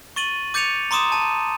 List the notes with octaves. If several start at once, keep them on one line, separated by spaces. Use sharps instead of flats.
C#6 A6 D#7 F#7
D6 G6 A6 C#7 D#7 F7
A#5 C6 D6 D#6 E7
A5 D#7